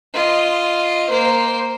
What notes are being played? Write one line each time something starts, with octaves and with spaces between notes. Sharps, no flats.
F4 D#5
A#3 C5